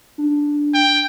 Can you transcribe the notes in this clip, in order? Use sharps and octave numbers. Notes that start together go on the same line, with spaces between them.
D4
G5